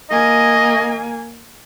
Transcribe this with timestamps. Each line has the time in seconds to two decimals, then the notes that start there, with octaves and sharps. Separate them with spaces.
0.11 A#3 D#5 G#5